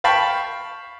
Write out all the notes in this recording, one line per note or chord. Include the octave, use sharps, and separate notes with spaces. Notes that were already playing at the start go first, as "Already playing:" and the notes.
F5 G5 A5 B5 C#6